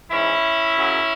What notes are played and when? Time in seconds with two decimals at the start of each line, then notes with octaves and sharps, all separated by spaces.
0.11 G#2 E3 C#4 E4
0.76 F#2 C#3 F#3